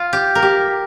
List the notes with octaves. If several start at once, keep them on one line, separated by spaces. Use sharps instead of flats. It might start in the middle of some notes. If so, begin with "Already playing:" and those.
Already playing: F4
G4
A#4
G4